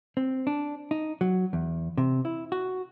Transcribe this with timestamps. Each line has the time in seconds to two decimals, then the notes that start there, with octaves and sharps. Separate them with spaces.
0.17 C4
0.47 D4
0.91 D#4
1.21 F#3
1.53 E2
1.98 C3
2.25 E4
2.52 F#4